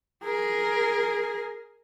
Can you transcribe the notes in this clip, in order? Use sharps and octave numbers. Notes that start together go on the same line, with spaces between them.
G#4 A#4